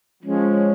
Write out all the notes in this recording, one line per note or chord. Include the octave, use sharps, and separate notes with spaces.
F3 G#3 C#4